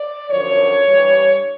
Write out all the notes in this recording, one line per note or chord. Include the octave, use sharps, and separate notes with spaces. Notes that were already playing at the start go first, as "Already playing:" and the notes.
Already playing: D5
F#2 D3 F3 C#5
G2 E3 G3